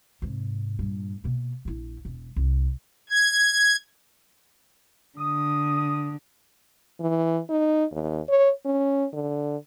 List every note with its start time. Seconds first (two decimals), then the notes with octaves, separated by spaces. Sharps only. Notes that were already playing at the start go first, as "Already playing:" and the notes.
0.22 G#2 C3
0.79 G2 A#2
1.24 B2 A#3
1.65 A#1 E4
2.05 E1
2.36 C2
3.10 G#6
5.17 D3 D#6
7.00 E3
7.49 D#4
7.91 D#2
8.29 C#5
8.65 C#4
9.13 D3